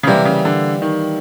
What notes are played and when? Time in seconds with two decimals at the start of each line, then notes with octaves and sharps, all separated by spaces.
0.03 C#3
0.07 C3 E3 G3 A#3
0.25 C#3
0.45 D3
0.82 D#3